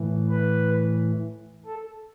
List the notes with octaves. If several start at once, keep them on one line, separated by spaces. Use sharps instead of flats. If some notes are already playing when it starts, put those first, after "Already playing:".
Already playing: A2 E3
B4
A4